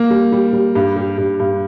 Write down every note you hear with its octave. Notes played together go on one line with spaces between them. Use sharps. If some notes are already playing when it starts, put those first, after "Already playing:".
Already playing: A#3
G3
G3
G3
G2
G3
G2
G2